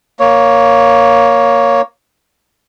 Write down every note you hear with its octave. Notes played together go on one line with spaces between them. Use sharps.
A#3 C#5